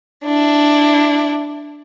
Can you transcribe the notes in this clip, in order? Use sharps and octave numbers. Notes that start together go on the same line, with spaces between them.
D4 E4